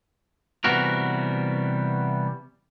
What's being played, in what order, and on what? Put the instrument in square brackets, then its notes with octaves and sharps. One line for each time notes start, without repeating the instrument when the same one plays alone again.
[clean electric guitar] C3 E3 G3 B3 F#4 A#4